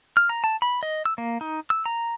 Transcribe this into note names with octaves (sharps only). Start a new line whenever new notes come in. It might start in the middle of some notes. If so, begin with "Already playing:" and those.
F6
A#5
A5
B5
D#5
E6
A#3
D#4
E6
A#5